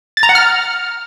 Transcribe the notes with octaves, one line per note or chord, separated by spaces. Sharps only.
A6
A#5
F#5
F6